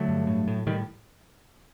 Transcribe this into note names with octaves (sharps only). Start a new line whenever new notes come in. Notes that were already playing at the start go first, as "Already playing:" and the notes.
Already playing: D3 F#3 A3
G2
A2
A2
A2 D#3 G3